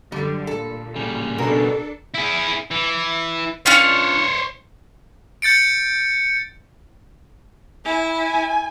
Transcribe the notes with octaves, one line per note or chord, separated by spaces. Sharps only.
F#2 D3 G3
A#2 A4
C#3 G3
B2 D4 A4 A#4
E4 G#4
E3
C#4 D4 F4 C5 C#5
G6 A6 C#7 D7
E4 G#5
G#5